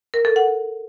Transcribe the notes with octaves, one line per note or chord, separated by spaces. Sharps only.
A#4
A4
F#5